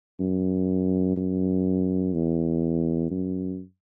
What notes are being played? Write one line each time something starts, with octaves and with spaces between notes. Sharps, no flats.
F#2
F#2
E2
F#2